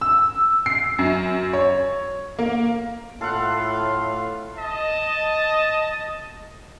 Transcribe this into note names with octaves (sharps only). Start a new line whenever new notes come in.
E6
C7
F#2
C#5
A#3
A2 F4 A4 F5 F#5
D#5 A5